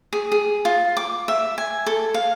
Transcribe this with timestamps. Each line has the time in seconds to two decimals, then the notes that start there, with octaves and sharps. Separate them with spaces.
0.13 G#4
0.32 G#4
0.65 F4
0.97 D6
1.28 E5
1.58 G#5
1.86 A4
2.14 F5